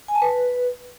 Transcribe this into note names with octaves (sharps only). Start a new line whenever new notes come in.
G#5
A5
B4